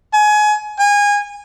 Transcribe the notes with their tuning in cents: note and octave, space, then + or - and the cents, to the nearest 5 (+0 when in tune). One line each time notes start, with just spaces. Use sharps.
G#5 +25
G#5 -25